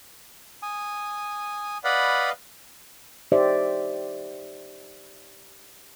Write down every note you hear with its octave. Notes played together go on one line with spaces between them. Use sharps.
G#5 D#6
B4 D5 D#5 F5 F#5 B5
D#4 G4 C5 D5 E5